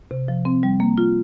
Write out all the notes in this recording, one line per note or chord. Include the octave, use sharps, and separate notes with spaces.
C3
F3
C4
G3
A#3
F4